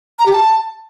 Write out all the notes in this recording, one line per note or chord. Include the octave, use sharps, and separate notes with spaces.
A#5
G4
A5